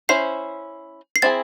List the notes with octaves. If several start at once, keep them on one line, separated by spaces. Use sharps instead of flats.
C#4 E4 C5 C7
C7
C4 E4 G#4 A6